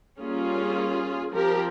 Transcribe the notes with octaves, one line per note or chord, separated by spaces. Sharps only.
G3 A#3 C#4 F4 G#4
F3 C4 G4 A#4